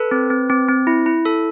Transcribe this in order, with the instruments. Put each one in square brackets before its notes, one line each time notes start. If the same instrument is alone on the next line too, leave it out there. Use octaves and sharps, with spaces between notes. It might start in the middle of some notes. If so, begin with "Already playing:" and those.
Already playing: [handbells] A4 B4
C4
C4
C4
C4
E4
E4
A4